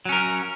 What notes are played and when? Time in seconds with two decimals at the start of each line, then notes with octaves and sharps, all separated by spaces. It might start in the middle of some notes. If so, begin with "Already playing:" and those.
0.05 F#3
0.09 C#4
0.12 A#4